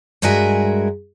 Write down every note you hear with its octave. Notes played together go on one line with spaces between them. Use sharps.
G2 G#3 F#4 A#4 E5 G#5